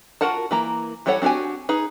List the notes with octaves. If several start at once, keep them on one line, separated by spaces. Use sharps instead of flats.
F4 F#4 A#4 F#5 A5
E3 A#3 A#5
E3 G3 A4 C#5 F#5
C4 D4 F#4 G4 G#5
D#4 G#4 B4